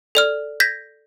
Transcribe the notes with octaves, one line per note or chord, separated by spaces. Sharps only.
A4 D5 F6
G6 G#6 A#6 B6